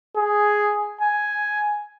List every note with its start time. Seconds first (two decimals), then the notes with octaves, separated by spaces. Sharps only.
0.17 G#4
1.01 G#5